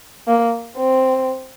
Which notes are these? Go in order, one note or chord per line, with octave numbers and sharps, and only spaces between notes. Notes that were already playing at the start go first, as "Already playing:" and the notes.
A#3
C4